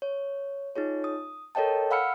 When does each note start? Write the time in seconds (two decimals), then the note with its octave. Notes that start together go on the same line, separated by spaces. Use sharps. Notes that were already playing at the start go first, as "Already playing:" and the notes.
0.02 C#5
0.76 D#4 F4 G#4 C#5
1.04 D#6
1.55 A4 A#4 C#5 D#5 G5 A5
1.91 F5 F#5 B5 E6 F6 C#7